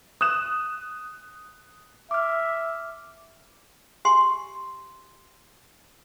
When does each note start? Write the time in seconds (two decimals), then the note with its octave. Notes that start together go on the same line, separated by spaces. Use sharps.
0.21 D#6 F#6 E7
2.11 E5 D6 F6
4.05 G4 G#5 C6